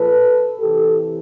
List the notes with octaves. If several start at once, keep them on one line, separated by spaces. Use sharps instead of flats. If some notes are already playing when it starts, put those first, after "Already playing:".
Already playing: A#2 F3 A4 B4
C3 E3 G4 A4